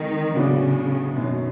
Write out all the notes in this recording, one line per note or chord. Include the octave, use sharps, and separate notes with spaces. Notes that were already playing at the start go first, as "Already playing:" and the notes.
Already playing: D#3 G#3 C4 D#4
A2 C#3 F#3 B3 D4 F#4
F#2 B2 D#3 F#3